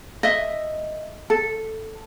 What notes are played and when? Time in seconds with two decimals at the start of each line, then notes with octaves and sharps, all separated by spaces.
0.23 D#5 E5
1.30 A4